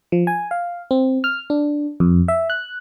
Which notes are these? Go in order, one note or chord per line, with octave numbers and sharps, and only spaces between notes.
F3
G#5
F5
C4
F6
D4
F2
E5
F#6